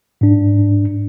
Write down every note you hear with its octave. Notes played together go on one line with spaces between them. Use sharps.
G#2 D4